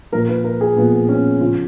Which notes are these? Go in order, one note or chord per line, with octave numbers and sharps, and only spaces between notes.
A#2 F3 A#4
B4
A#4
G#4
A#2 F3 B3
B3
C#4
C#3 F3 F4